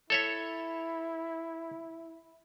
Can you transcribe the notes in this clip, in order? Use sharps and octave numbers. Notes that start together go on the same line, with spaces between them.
E4 A4 C#5 E5